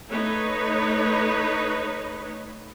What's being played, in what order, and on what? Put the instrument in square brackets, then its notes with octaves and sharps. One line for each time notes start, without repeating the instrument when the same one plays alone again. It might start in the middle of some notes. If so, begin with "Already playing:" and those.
[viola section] A3 D#4 B4 C#5